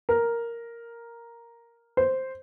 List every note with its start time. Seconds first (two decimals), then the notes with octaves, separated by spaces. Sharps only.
0.09 A#4
1.97 C5